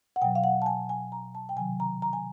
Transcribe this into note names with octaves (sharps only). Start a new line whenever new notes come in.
F#5
B2 F#3 G5
F5
F#5
A5
G#5
G#5
A#5
A5
G5
C3 D#3 F#3 G#5
A#5
A#5
G#5